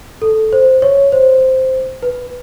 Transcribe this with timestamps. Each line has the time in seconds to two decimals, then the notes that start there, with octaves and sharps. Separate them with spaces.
0.22 A4
0.53 C5
0.82 C#5
1.12 C5
2.03 B4